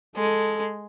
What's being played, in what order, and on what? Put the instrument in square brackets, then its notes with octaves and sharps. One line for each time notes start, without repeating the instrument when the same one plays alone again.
[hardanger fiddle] G#3 [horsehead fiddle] A4